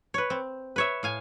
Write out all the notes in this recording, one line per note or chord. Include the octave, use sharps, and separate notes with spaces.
B4 C#5
C4
B4 C#5 E5
A2 F5 G#5